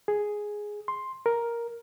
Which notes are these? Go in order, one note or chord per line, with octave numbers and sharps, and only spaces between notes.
G#4
C6
A#4